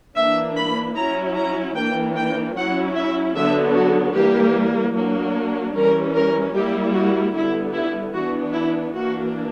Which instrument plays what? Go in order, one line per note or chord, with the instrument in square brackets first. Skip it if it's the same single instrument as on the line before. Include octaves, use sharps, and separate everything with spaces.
[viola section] E3 A#3 D4 E5
B5
F#3 C#4 E4 A#5
A#5
E3 A#3 D4 G5
G5
F#3 C#4 E4 F#5
E5
D3 F#3 B3 D4 E5
F#4
E3 G3 A#3 G4
F#3 A#3 D4
E3 G3 C#4 A#4
A#4
G3 A#3 E4 G4
F#4
D3 G3 B3 E4
E4
E3 B3 D4 F#4
E4
E3 A#3 D4 F#4